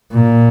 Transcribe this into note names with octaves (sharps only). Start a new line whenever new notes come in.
A#2